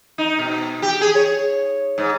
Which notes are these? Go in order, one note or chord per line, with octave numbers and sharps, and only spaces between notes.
D#4
B2
G4
G#4
C#5
G#2